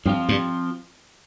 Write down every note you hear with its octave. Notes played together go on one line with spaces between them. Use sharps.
G2 F3 C4 F4
G2